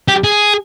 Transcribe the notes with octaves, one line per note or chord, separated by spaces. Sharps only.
G4
G#4